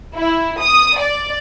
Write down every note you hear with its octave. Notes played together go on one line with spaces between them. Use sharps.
E4
D#6
D5